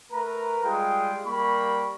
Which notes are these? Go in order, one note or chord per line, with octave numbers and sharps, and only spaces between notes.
A3 A#4 B4 A#5
G3 G#3 F4 G#4 G5
G3 A#3 B5 C#6